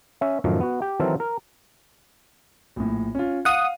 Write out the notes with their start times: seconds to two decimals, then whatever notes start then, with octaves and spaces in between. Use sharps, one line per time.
0.21 C#4 E5
0.44 F#2 A2 D#3 F3
0.61 B3 F#4
0.82 G4
1.00 D#3 E3 F#3 C4 A4 A#4
1.20 A#4
2.76 A#1 A2
3.15 C#4 F4
3.45 F5 F#5 D#6 D#7